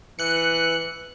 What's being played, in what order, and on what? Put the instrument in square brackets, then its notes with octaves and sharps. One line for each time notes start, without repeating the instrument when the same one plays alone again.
[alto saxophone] E3 [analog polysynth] F#6 C#7